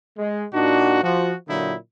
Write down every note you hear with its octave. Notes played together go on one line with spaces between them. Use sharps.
G#3
A#2 D4 D#4 F#4
F3 F#4
A#2 D3 F#3 A#3 D#4 E4